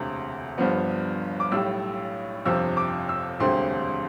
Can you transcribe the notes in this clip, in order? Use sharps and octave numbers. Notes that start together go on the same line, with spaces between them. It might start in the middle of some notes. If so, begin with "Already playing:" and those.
Already playing: E1 D2 C3
G1 G2 F3 B3
D6
B1 A2 G3 E6
G1 F2 C3 F3 E6
D6
E6
E1 D2 D3 G3 C4 C6